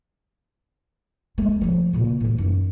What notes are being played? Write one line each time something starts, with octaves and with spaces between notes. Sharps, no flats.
G#3 A3
D3 F3
A#2 C#3
A2 E3
F#2 D#4